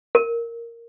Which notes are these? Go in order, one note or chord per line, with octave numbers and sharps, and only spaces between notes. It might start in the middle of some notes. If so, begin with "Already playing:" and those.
A#4